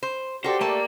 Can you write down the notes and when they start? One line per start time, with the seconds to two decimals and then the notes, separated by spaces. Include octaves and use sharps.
0.03 C5
0.44 F#4 G4 A4 C5 D5
0.61 A3 A#3 A#4 A5